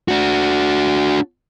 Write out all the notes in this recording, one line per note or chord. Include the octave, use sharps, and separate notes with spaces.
D4 F#4